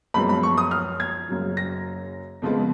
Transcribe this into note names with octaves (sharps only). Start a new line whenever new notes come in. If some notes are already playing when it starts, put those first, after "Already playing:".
F#2 F3 G#3 B3 B5
B5
C#6
D#6
F6
G#6
F#1 F#2 C#3 F#3
A#6
F2 C#3 F3 G#3 B3